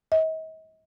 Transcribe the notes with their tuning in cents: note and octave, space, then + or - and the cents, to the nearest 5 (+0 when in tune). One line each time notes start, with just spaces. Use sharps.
D#5 +40